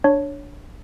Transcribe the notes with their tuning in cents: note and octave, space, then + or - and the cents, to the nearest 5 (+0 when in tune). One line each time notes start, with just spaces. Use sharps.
D4 -5 C#5 +0